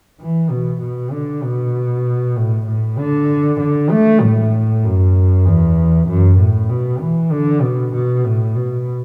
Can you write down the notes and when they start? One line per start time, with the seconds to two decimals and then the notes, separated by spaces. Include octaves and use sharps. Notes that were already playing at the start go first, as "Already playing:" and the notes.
0.20 E3
0.51 B2
0.82 B2
1.12 D3
1.43 B2
2.36 A2
2.67 A2
2.98 D3
3.60 D3
3.90 A3
4.22 A2
4.83 F#2
5.46 E2
6.08 F#2
6.39 A2
6.69 B2
7.00 E3
7.32 D3
7.62 B2
7.93 B2
8.24 A2
8.55 B2